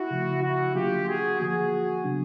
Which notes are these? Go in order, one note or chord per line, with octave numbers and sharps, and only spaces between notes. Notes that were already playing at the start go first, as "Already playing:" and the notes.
Already playing: E4 F#4
C#3 F3 A3
E4 F#4
D3 F#3 A#3 D4 F4 G4
F#4 G#4
D3 F3 A#3 F#4 G#4
C#3 F#3 B3 D4